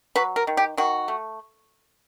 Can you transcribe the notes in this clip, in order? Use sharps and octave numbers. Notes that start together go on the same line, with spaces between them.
F#3 B4
A#4
D#3
G4
D#3 F#4
A3